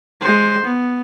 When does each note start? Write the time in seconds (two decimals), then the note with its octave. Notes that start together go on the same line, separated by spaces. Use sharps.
0.21 G#3 C5
0.65 B3